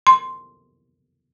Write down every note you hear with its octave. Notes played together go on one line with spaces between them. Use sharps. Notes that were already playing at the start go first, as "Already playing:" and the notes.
C6